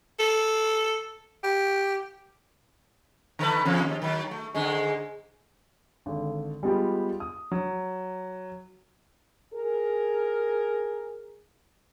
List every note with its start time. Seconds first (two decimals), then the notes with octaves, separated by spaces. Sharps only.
0.20 A4
1.44 G4
3.39 D3 A4 B4
3.65 E2 C#3 F3
3.82 D#2
4.02 D#3 F#3
4.31 A3
4.55 G#2 D3 G#3
6.06 G#1 D3
6.63 G3 G#3 B3 F4 G4
7.20 D#6
7.52 F#3
9.54 G#4 A#4